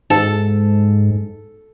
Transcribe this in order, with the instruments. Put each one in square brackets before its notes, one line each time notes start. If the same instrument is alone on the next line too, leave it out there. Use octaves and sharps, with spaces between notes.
[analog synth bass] G#2 [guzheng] A4